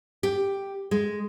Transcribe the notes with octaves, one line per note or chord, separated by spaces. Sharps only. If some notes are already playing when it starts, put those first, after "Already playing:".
G4
G#3